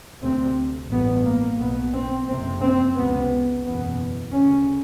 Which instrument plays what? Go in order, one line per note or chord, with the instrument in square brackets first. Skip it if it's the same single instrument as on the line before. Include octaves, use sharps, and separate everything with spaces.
[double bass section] D2 C3 C4
A1 G2 B3
A#3
B1 B2 B3
C4
F#1 F2 C3 C4
C4
C#2 C3 B3
F#1 E2 B2 B3
D2 C#3 C#4